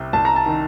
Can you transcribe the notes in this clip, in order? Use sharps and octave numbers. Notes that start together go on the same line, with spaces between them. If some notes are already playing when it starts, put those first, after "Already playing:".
Already playing: C2 C3
C2 A5
A#5
A5
D#3